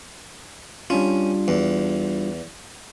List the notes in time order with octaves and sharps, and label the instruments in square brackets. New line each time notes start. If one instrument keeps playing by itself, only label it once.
[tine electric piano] G3 D4 F4 [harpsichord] C#4
[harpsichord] E2